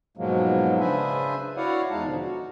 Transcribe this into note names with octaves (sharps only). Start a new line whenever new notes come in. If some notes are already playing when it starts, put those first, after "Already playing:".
G#2 B2 F3 F#3 G#3 A#3
C#3 D4 B4 C5 E5 G#5
E4 F#4 C#5 D5 F5 F#5
E2 G#3 D#4 F5 A5
B2 D3 F3
F#4